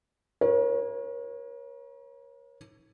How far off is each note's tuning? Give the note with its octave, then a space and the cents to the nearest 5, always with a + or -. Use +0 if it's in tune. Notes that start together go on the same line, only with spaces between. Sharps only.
A#4 +40 C#5 -25